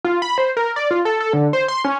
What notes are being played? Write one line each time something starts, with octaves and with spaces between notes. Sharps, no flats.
F4
B5
C5
A#4
D5
F4
A4
A4
D3
C5
C6
C#4